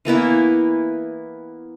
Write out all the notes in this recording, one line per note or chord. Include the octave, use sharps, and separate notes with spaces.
E3 A#3 B3 E4